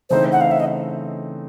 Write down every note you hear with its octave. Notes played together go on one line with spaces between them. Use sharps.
C#3 E3 A3 C4 D#4 C5
F#5
F5
E5
D#5